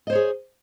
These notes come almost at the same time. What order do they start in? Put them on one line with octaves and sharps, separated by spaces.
D#5 C5 C#5 G#4